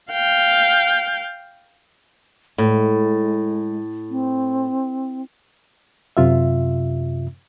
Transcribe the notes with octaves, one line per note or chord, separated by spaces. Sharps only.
F5 G5
A2 G#3
C4
F#2 C3 F4 E5